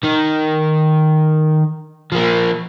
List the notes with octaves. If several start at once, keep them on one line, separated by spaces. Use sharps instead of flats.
D#3
F3 A#3